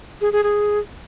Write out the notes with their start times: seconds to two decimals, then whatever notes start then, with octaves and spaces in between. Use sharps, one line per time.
0.21 G#4
0.32 G#4
0.43 G#4